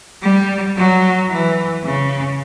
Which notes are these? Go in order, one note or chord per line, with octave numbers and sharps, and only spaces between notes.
G3
F#3
E3
C#3